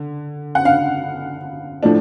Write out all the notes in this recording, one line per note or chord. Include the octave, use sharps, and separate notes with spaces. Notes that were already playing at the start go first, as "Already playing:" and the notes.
Already playing: D3
F#5
F5
A2 F3 A3 D4